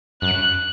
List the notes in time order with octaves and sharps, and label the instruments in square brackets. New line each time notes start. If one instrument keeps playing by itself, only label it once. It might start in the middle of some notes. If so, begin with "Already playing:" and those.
[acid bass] F#2 [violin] F#6